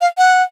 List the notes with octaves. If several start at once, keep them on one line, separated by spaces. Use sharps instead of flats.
F5
F#5